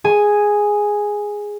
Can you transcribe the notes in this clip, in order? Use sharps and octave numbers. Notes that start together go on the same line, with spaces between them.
G#4 G#5